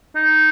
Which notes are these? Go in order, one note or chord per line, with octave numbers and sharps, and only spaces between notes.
D#4